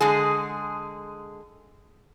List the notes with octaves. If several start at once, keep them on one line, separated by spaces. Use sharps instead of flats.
D3 G#3 G#4